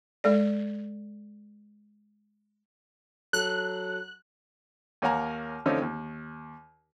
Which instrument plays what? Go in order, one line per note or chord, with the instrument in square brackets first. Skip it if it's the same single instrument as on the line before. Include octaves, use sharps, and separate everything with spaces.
[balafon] G#3 A4 D5
[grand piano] F#3 A4 [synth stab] F#6
[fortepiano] D#2 A#3 C#5 F#5 G#5 A#5
D3 F3 A3 C4 C#4 D#4
D#2